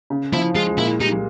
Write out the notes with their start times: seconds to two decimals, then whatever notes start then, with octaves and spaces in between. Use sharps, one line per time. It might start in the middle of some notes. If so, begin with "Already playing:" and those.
0.10 C#3
0.33 F3 E4
0.55 G#3 F4
0.78 A#2 E4
1.00 G3 D#4